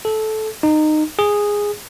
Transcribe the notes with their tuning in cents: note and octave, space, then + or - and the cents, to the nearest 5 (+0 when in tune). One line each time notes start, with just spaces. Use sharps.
A4 -15
D#4 -20
G#4 -10